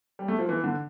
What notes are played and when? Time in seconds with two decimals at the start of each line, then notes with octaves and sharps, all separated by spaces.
0.19 G3
0.28 A3
0.39 F3
0.49 E3
0.64 D3